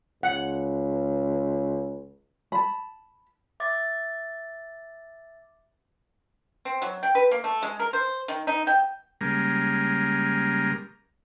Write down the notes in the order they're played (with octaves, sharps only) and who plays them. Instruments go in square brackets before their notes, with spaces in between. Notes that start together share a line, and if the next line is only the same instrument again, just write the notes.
[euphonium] C#2 [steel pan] F#5
[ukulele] A5 B5
[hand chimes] E5 D6 A6
[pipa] C4
F#3
G5
B4
A#3
A3
G#3
A#4
C5
D#3
D#4
G5
[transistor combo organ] C#3 G3 G#3 A#3 A#4